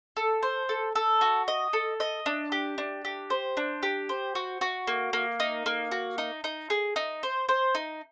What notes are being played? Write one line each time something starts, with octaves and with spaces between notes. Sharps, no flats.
A4
C5
A4
A4
F#4
D#5
A4
D#5
D4
G4
D4
G4
C5
D4
G4
C5
F#4
F#4
A#3
A#3
D#4
A#3
F#4
D#4
D#4
G#4
D#4
C5
C5
D#4